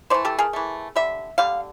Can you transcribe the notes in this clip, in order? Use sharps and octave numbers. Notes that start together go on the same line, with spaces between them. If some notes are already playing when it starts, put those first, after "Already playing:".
E3 A3 C5 D5
G4 A4
G#4 A#4
E3 A3
D3 G3 E5
D3 G3 F5